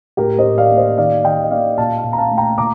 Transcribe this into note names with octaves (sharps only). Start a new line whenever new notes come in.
A2 G4 A#4
C5 D#5
A2
D5 F5
A#3
C5 D#5
D#3 D5 F5
D#3 D#5 G5
D#5
A#3 D5 F5
A#2 F5 A5
F5 A5
A#2
A#5
F5 A5
A3
G5 A#5
A#2 A#5 D6